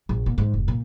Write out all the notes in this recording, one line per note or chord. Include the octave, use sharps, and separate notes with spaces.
A#1
A#2
G#2
F1
A#2